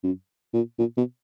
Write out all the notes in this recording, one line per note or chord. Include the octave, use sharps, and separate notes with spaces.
F#2
A#2
A#2
B2